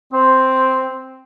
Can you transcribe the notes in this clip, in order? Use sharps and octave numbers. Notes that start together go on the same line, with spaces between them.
C4